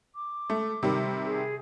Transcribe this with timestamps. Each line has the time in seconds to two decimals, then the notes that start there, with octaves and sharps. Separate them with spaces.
0.15 D6
0.50 A3
0.83 C3 D#3 G3
1.26 G#4